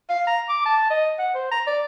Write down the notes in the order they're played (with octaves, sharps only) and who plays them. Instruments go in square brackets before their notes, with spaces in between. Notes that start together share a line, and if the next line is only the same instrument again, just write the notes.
[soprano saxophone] F5
A#5
D6
A5
D#5
F#5
C5
A#5
D5